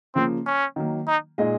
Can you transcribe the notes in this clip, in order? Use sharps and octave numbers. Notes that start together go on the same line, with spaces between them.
C#3 F3 A#3 C4
C#4
D#3 F#3 A#3
D#4
A#2 G#3 D#4 G#4 D#5